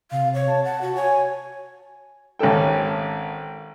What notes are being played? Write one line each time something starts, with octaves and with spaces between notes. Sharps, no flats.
C3 F5
C#5
A5
F#5
F#4
C#5 G#5
G#1 C#4 G4 A4 G5